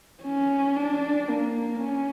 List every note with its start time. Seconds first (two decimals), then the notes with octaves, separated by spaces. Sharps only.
0.24 C#4
0.76 D4
1.28 A#3
1.79 C#4